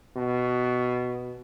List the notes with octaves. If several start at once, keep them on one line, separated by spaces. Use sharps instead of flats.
B2